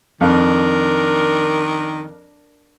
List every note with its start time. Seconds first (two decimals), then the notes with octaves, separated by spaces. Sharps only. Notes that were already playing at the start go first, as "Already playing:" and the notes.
0.21 F2 D#3 D4 A#4